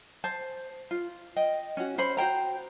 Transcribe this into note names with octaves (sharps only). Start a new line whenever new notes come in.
C5 A5
F4
D#5 G5
C#4 F#4
C#4 C5 B5
F#4 C5 G5 A#5